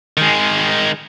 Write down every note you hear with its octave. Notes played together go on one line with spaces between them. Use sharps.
D#3 G#3